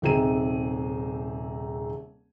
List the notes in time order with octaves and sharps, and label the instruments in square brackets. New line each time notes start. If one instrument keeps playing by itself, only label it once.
[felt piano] D#1 C3 C4 D#4 G#4 D#7